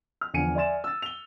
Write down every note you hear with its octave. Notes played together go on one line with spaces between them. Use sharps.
F6
E2 D3 F3 G#5 C#7 D#7
D5 E5 G#5 C6 A6 E7
E6 A6
F7 G7